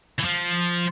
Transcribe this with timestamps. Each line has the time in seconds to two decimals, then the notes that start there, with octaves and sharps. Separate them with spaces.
0.19 E3
0.25 F3